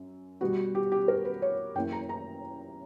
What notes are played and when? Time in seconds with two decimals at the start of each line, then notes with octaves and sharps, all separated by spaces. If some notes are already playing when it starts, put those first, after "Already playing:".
Already playing: F#2
0.41 B2 G3 B3 F#4
0.75 G4
0.92 G4
1.08 A#4
1.25 B4
1.42 C#5
1.75 F#2 E3 A#3 G5
1.92 A#5
2.09 A#5